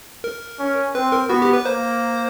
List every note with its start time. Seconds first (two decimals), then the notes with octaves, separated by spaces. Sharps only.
0.24 A#4
0.60 C#4
0.95 C4 B4
1.12 A#4
1.29 B3 F#4
1.42 G4
1.53 B4
1.65 A#3 C5